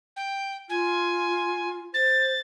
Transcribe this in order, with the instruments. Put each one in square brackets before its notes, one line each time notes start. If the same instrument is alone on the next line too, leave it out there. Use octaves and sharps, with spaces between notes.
[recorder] G5
[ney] F4 [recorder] G#5
[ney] C5 [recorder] A6